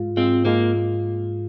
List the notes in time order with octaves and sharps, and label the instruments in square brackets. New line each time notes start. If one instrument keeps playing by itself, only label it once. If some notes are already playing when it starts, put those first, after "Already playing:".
Already playing: [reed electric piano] G#2 G#3 F4
[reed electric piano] G#2 G#3 F4 [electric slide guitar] C4
[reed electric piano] G#2 G#3 F4 [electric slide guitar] A#3